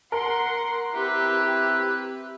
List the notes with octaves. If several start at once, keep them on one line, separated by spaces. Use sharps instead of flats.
A#4 F#5 C6
C4 E4 G4 B4